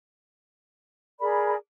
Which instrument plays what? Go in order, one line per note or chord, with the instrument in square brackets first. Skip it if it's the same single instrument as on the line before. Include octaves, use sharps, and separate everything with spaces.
[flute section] G#4 A#4 D5 B5